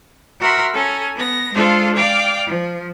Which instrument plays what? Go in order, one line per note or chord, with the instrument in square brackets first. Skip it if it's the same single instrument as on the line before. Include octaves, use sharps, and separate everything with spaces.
[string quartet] F#4 A#4 E5 B5 C6
C#4 A4 G#5 A#5
B3 A#6
G#3 D4 F4 A4 C5 F5
D5 F5 G5 D6
F3